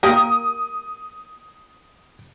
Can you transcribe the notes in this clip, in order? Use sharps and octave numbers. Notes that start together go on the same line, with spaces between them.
A#3 G4 A#4 D#6